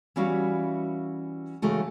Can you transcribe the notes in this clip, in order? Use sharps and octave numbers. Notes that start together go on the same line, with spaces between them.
E3 G3 C#4 E4 F#4 F5
C#3 E3 G#3 A3 F#4